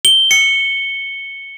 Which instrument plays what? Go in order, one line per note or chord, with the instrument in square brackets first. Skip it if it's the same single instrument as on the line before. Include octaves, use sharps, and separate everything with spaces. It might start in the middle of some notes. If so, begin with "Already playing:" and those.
[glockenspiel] G7
C#7